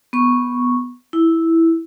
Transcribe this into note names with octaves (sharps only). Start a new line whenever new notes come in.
B3 C#6
E4